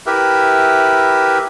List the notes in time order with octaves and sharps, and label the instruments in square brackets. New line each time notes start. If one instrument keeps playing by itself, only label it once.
[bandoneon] E4 G4 A#4 B4 E5